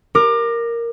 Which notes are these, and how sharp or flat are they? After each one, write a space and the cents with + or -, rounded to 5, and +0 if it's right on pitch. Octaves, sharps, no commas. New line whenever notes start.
A#4 +0 D6 +30